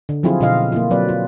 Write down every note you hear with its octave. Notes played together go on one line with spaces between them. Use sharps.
D3
F3 F#3 C4 E4 F4 G#4
B2 D3 F4 D#5 F5
A#3 E4 F4
F#3 C4 B4 D5
F4